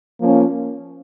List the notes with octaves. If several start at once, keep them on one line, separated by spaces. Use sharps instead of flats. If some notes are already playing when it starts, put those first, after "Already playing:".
F3 A#3 C#4